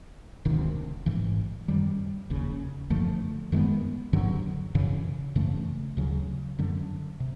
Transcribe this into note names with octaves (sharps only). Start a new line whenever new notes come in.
E1 D2 C3 D#3
A1 G#2 E3
F#2 D#3 G3
F1 D#2 C#3
F#2 D3 F3 A3
F#2 D#3 G#3 B3
G2 D3 F#3
F#2 C#3 E3
F#2 C#3 E3 A3
D2 C#3 F#3
F#2 D3 F#3
C3